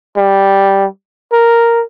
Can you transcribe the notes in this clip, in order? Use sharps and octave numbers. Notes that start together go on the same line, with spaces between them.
G3
A#4